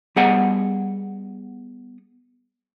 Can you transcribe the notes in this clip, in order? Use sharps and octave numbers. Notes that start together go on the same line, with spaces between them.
G3 B3 G#4 D#5 F#5